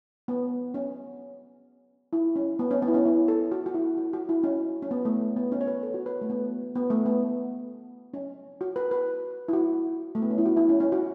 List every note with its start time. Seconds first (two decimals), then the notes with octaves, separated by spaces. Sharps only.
0.28 B3
0.74 C#4
2.13 E4
2.36 C#4
2.59 B3
2.71 C#4
2.82 B3
2.88 E4
2.94 C#4
3.05 E4
3.28 A4
3.52 F#4
3.66 F#4
3.74 E4
3.97 F#4
4.13 F#4
4.29 E4
4.43 C#4
4.82 C#4
4.91 B3
5.05 A3
5.36 B3
5.52 C#4
5.61 C#5
5.67 B4
5.83 A4
5.94 F#4
6.06 B4
6.21 A3
6.30 B3
6.75 B3
6.90 A3
7.06 B3
8.14 C#4
8.61 F#4
8.76 B4
8.91 B4
9.48 E4
9.53 F#4
10.15 A3
10.22 B3
10.31 C#4
10.38 E4
10.46 F#4
10.57 E4
10.69 C#4
10.80 C#4
10.92 F#4